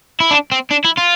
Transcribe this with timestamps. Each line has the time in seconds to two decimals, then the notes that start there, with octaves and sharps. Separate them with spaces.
0.20 E4
0.31 D4
0.52 C4
0.71 D4
0.85 E4
0.98 F4